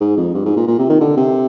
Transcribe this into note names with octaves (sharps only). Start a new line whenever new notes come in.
G#2
F2
G2
G#2
A#2
A#2
C3
D#3
D3
C3